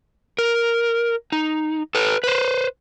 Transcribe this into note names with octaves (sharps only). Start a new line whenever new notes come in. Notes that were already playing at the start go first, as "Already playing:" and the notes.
A#4
D#4
A4 B4
B4 C5